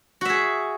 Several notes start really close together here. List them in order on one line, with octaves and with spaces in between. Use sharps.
F#4 E5 G#4